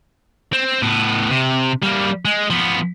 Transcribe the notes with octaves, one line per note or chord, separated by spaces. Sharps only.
C4
A2 B3
C3
G3 A#3
G#3
F3 B3